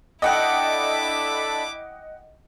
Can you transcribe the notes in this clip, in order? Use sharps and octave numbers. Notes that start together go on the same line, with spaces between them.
D4 E4 A4 D#5 F#5 G5 B5 D6